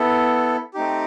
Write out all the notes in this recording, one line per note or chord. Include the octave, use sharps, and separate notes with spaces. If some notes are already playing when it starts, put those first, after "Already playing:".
Already playing: B3 E4 A4
A3 C4 D#4 G4